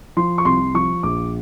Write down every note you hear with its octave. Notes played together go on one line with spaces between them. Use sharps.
F3 C6
C#6
C2 C6
F3 C#6
A#1 D6